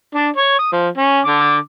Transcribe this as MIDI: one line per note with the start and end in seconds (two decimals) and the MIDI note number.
0.15 0.28 62
0.36 0.54 73
0.59 0.68 87
0.72 0.88 53
0.97 1.20 61
1.25 1.57 50
1.25 1.57 86